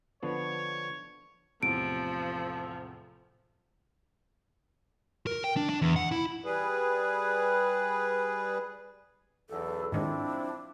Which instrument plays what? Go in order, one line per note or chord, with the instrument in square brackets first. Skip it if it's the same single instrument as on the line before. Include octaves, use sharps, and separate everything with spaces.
[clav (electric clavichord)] D3 F3 B3 [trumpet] C#5
[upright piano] E2 A2 C3 [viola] F3 [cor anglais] A4 [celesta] D7
[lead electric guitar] A#4
G5
D4
D4
E2
F#5
E4
[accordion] G3 G#4 B4
[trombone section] B1 E2 [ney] A4
[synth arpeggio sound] G#2 D#3 G#3 [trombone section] F3 C4 E4 [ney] D4